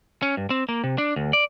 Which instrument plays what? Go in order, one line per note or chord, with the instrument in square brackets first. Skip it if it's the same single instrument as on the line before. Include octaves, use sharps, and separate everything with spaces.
[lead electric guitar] C#4
G2
C4
A#3
C3
D4
D2
D5